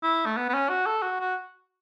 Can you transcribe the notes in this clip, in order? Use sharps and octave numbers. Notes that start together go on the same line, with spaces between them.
E4
A3
B3
B3
C#4
F#4
A4
F#4
F#4